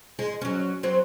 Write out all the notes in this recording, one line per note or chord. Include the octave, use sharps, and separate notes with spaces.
G#3
F#3 C#4
F#3 C4